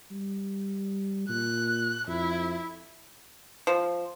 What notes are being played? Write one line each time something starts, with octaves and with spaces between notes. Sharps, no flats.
G3
A#2 F#6
F2 E4
F3